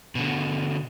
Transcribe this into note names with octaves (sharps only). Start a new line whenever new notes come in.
B2 D3